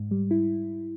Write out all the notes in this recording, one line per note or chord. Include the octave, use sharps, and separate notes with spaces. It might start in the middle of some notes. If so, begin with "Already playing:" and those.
Already playing: G#2
G3
E4